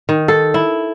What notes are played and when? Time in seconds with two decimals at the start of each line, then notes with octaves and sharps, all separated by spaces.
0.09 D#3
0.28 A4
0.54 E4